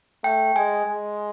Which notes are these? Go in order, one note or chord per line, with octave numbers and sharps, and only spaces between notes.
A3 G5
G#3 G#5
G#3